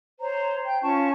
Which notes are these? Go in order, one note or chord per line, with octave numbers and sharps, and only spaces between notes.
C5 C#5 A#5
G5 G6
C#4 F4 A5 C#6